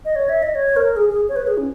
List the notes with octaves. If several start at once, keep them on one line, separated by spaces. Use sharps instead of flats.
D#5
C#5
E5
D#5
C#5
A#4
G#4
G#4
C#5
B4
G#4
C#4